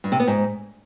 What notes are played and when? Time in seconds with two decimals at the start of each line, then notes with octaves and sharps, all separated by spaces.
0.04 G2
0.12 C3
0.20 B3
0.27 G#2